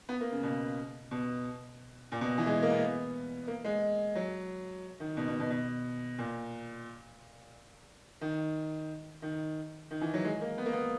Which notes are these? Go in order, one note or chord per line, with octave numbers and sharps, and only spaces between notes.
B3
A#3
C#3
B2
B2
A#2
B2
E3
G#3
A#3
B3
A#3
G#3
F#3
D#3
B2
B2
B2
B2
A#2
D#3
D#3
D#3
E3
F#3
G#3
A#3
B3
A#3
B3